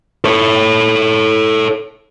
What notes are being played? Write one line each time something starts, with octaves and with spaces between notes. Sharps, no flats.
A4 C#5